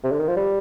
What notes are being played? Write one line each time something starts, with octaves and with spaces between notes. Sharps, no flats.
C3
D3
D#3
F3
G3